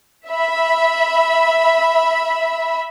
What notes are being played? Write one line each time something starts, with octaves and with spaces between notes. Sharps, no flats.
E5 B5